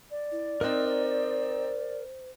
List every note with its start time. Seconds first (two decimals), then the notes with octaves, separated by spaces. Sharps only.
0.10 D5
0.32 E4
0.61 C4 D#4 A#4 C5 F#6